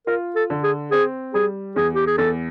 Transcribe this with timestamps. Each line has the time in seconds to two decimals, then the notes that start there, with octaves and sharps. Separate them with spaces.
0.07 F4 A#4
0.36 A4
0.50 D3
0.63 G#4
0.91 C4 G#4
1.34 G3 G#4
1.76 E2 G#4
1.95 G4
2.07 G#4
2.18 E2 A4